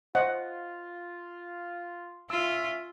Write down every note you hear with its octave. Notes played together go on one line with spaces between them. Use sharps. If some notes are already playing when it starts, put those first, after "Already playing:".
F4 C5 D#5 F#5
C#4 F4 E5 E6